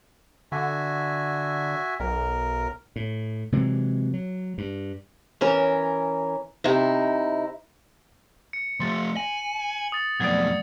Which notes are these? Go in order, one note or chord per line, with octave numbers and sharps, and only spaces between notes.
D3 F#4 E5 G#5
B1 A#4
A2
C3 E3 F#3 G#3
F#3
G2
E3 C#4 A#4
C3 D#4 E4
C#7
F3 A3 C6 A6
G#5 F#7
D#6 A6
F2 B2 F#3 A3 D5 D#6 G#6